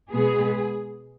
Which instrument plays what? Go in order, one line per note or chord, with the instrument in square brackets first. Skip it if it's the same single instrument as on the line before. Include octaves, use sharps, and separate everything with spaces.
[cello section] B2 G#3 B3 G#4